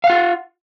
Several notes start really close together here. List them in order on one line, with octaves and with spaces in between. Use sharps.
F5 F#5 F4